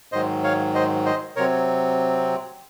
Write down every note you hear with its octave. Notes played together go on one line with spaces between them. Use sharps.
G#2 D#3 F#3 C5 D#5
C#5 F5
C5 D#5
C5 D#5
C3 F#3 C4 A#4 C#5